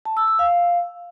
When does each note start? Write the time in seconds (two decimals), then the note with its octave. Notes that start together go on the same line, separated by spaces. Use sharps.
0.05 A5
0.17 E6
0.28 E6
0.39 F5